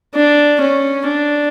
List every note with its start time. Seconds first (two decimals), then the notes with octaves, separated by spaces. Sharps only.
0.15 D4
0.61 C#4
1.07 D4